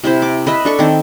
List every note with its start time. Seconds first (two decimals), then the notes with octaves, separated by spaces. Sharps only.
0.04 C3 E4 C5
0.22 D6
0.47 B4 D#5 E5 B5
0.65 D4 A4 C#6
0.79 D#3 C4